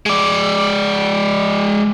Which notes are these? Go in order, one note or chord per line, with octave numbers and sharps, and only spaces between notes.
G#3 D5